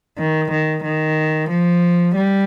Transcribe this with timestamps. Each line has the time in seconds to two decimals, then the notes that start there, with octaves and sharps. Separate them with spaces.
0.18 D#3
0.51 D#3
0.84 D#3
1.49 F3
2.16 G3